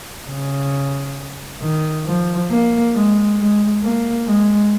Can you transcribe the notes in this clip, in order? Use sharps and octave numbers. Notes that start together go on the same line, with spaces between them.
C#3
D#3
F3
A#3
G#3
G#3
A#3
G#3